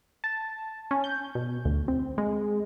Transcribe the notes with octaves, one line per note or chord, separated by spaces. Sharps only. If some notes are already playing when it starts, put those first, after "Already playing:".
A5
C#4
G6
B2
D2
C4
G#3